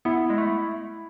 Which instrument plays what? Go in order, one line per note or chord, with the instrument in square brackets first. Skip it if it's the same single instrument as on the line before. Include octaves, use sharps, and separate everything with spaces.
[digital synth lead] B3 [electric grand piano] E4
[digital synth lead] G#3
A3